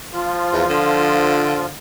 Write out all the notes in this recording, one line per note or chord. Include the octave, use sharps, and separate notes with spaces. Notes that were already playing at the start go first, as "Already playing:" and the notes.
F3 F4
E2
D3